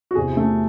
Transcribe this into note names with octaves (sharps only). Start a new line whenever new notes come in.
F#4
E2 C3 E3 G#4
A3